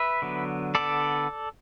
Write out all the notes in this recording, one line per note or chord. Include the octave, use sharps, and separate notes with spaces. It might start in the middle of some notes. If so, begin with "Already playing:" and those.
Already playing: B4 E5
D3 F#3 B3
D3 B3 A4 D5